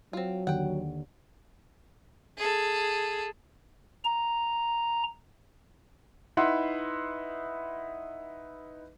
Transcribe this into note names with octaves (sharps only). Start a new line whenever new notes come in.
F#3 C4 F4
D#2 D3 F#5 G5
G#4 A4
A#5
D#4 E4 B4 E5 F#5 C6